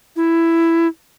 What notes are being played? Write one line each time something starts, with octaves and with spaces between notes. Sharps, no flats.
E4